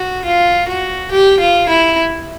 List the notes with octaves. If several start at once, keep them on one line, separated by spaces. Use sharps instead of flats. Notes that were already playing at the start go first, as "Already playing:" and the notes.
Already playing: F#4
F4
F#4
G4
F4
E4